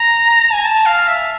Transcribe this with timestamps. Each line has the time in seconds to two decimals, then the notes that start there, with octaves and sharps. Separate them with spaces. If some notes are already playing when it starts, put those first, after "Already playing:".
Already playing: A#5
0.53 G#5
0.64 A5
0.86 F5
1.08 E5